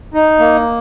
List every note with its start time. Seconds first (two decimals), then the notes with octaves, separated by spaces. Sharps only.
0.14 D#4
0.39 A#3